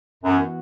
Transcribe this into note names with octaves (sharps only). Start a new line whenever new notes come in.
F#2 E3 B3 F#4